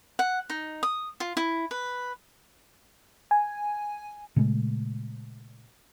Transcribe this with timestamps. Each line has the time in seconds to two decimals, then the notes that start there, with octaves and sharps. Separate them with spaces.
0.19 F#5
0.50 D#4
0.83 D#6
1.20 F4
1.37 E4
1.71 B4
3.31 G#5
4.36 A#2 C#3 G#3 A3